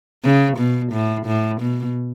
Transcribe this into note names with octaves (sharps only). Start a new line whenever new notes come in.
C#3
B2
A2
A2
B2